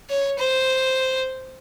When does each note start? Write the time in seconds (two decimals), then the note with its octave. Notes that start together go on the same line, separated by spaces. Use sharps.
0.10 C#5
0.39 C5